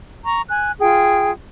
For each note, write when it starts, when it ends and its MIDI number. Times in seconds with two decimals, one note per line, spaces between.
0.24 0.42 82
0.24 0.42 85
0.49 0.72 80
0.49 0.72 90
0.80 1.30 65
0.80 1.30 68
0.80 1.30 79